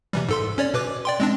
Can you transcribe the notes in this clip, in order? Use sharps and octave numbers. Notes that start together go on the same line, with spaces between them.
C3 E3 G3
G#2 A4 C6
C#4 C#5 D5
B2 B4 D6
D5 G5 C6
G#3 C4 D4